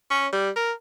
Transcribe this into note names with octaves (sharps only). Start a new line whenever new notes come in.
C#4
G3
A#4